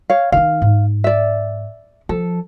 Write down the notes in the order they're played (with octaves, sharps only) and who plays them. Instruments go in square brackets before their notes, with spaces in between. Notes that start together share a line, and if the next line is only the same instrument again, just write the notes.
[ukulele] C#5 F5
[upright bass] D#3 D#4 [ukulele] F5
[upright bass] G#2
[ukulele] D5 E5
[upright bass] F3 [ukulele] A4